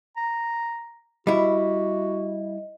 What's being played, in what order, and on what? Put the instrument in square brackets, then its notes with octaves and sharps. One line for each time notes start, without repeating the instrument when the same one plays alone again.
[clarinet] A#5
[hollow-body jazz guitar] G3 E4 [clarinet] F#4 [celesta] D#5